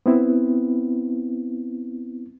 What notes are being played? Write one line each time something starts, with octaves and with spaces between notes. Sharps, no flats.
B3 C4 E4